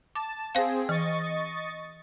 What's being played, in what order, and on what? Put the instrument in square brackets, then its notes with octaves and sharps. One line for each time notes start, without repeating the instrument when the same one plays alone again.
[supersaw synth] A5 [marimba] D6
[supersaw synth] C4 G#4 [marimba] C5 F5
[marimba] E3 [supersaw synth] D#5 C#6 A6